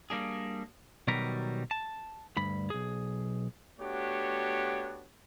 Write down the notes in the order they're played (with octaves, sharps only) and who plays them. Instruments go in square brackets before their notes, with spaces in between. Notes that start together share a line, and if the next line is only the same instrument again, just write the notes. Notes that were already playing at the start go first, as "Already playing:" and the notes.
[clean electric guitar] G3 A#3 D4 G#4
B2 D#3 F#3 G3 A#4 B4
A5
D2 G2 B5
B1 G#4
[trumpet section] A3 B3 D4 F#4 G4 C#5